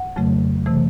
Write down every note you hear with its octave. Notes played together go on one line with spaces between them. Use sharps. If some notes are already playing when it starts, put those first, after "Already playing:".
Already playing: F#5
F2 C#3 F#3 A3
C3 E3 A3